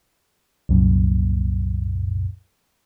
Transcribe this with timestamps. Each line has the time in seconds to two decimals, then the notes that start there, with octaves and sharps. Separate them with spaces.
0.69 C2 F#2 A#2